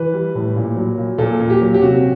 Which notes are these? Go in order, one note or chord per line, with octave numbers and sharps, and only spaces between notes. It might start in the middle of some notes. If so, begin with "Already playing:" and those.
Already playing: E3 B4
G3
A2
A#2
F#3
A#2
A#2 A4
A#2
G4
F#3
G4
C3 F#4